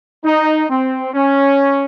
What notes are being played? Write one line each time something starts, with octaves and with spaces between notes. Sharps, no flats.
D#4
C4
C#4